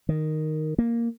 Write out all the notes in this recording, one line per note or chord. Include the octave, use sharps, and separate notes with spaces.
D#3
A#3